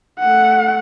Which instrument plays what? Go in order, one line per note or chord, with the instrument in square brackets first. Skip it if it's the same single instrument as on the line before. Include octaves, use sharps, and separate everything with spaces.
[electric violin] A3 F#5